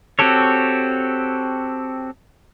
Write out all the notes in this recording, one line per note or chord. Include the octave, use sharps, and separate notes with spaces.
C4 F#4 G4 A4 C#5